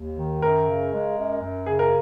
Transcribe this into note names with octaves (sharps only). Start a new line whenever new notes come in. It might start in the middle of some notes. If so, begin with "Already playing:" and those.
Already playing: D#2
D#3
F#2 A#4
C#3
G#3
F#2
F#2
C#3 G#4
A#4